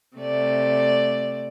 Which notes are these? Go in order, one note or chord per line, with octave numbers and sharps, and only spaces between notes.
C3 A3 D5